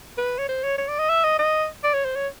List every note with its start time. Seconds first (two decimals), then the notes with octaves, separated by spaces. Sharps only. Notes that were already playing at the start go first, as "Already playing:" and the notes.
0.18 B4
0.38 C#5
0.49 C5
0.64 C#5
0.78 C#5
0.88 D5
0.99 D#5
1.09 E5
1.24 D#5
1.39 D#5
1.84 D5
1.94 C#5
2.05 C5
2.16 C#5